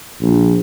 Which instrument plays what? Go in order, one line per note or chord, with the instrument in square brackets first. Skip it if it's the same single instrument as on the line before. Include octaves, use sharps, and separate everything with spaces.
[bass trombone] A#1